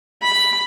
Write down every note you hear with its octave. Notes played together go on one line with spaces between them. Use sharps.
B5